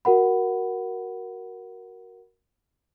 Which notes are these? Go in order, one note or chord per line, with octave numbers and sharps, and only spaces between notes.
F#4 A#4 F#5 B5